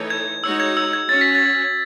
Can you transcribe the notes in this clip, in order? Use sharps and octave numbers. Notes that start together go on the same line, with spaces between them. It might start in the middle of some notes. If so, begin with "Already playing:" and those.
Already playing: E3 A3 D#4 A4 C#5
G#6
G#3 D#4 F#4 C#5 E6
G#6
E6
G#6
C#4 F#4 C#5 A6
B6
A6